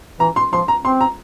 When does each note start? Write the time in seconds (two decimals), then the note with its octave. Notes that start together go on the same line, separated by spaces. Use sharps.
0.20 E3 A#5
0.36 C6
0.53 F3 C6
0.68 A#5
0.85 C4 C6
1.01 A#5